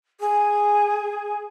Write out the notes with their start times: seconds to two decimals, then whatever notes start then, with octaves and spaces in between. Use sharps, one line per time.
0.20 G#4